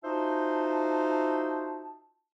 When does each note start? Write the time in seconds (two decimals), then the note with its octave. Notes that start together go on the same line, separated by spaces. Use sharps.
0.04 D#4 F4 F#4 C5 E5 A5